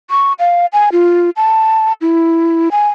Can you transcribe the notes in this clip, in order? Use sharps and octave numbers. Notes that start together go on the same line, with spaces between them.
C#6
F5
G#5
F4
A5
E4
G#5